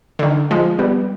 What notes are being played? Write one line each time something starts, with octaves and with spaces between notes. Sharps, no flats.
D3
D#3
F3 G#3
G3 B3